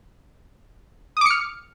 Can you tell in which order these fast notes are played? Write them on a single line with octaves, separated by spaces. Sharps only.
D#6 D6 C#7 F6